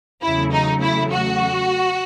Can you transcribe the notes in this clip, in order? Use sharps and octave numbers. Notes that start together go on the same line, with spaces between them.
E2 C#3 F#3 A3 E4
D#4
E4
F#4